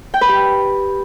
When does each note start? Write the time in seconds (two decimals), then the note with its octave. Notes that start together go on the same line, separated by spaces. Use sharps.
0.14 G5
0.21 B4
0.29 G4